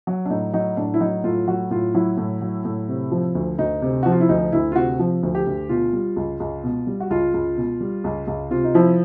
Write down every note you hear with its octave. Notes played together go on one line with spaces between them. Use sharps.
F#3
D4
A2 D#4
F#3 D#4
A2 D4
E4
F#3 D#4
A2 F4
F#3 F#4
A2 F4
F#3 E4
A2
F#3
A2
C3
F3
D2
D2 D#4
C3
F3 F#4
F4
E4
D2 D#4
D2 E4
F4
C3 F#4
F3
D2
G4
D2
B2 F4
G3
C#2
C#2
B2
G3
F#4
C#2 F4
C#2
B2
G3
C#2
C#2
C3 F4
D#4
F3 E4